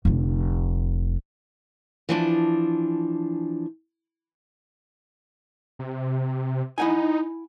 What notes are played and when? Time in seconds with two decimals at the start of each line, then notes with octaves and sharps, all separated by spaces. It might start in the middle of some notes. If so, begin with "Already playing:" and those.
0.05 F1 D3
2.09 E3 F3 D4
5.79 C3
6.78 D#4 E4 F#5 G#5